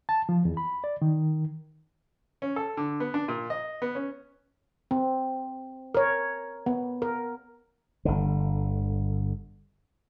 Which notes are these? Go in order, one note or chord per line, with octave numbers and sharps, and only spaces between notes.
A5
F3
E2
B5
D5
D#3
C#4
A4
D3
B3
D4
A#2
D#5
B3
C#4
C4
A#4 C#5
B3
A#4
G1 D3